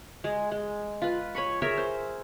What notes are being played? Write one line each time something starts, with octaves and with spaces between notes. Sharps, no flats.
G#3 G#4
G#3
F4 B4
C#5 G#5 B5 C#6
G#4 A#4 C#5 E5
C5